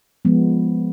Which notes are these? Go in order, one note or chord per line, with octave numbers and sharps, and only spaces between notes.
F3 G#3 B3